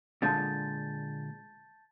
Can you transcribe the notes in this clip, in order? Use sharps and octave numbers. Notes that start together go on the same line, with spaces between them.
A#2 D3 G#3 A5 G6 A6